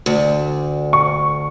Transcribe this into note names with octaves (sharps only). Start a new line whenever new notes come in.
D2
C#6